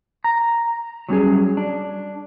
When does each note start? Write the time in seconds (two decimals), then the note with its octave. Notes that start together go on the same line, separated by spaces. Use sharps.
0.24 A#5
1.09 F#3 G3 C#4 G#4
1.57 D4